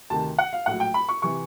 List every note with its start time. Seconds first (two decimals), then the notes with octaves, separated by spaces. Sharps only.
0.10 D2 C3 D#3 A5
0.38 F#5
0.53 F5
0.66 A#1 A2 F#3 F#5
0.80 G5
0.94 B5
1.09 C#6
1.22 C3 E3 C#6